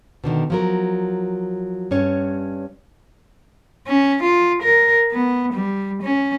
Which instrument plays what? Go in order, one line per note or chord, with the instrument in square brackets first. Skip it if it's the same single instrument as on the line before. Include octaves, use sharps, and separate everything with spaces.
[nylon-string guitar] B2 D3 D#3
F3 F#3 A#4
G2 C#4 C#5
[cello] C#4
F4
A#4
B3
G3
C#4